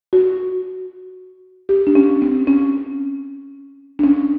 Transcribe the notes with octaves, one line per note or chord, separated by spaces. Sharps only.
F#4
G4
D4
C#4
C4
C#4
D4
C#4